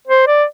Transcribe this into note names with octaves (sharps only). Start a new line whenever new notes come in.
C5
D5